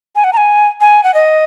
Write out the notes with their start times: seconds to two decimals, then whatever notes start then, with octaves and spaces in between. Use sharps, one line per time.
0.16 G#5
0.24 F#5
0.33 A#5
0.37 G#5
0.81 G#5
1.04 F#5
1.14 D#5